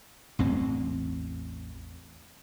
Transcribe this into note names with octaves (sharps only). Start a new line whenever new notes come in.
A1 E2 C4